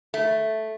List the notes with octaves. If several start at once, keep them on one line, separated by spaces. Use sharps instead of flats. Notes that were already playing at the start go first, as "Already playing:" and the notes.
A3